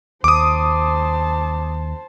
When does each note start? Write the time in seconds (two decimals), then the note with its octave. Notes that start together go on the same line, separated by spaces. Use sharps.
0.24 D#2 C5 A5 D6 D#6